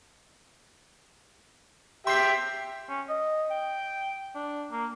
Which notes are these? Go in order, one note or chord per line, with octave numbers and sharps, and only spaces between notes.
G4 E5 G5 C6 B6 C7
C#4
D#5
G5
D4
A#3